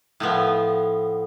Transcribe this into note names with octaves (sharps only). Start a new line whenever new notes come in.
A2 F3 B3